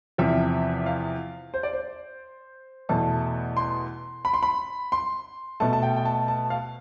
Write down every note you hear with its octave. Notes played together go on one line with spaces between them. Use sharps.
E2 C3 F3 E5
F5
C5
D5
C5
E2 B2 A3 A5
C6
B5
C6
B5
C6
B2 A3 A5
A5
G5
G5
A5
A5
F5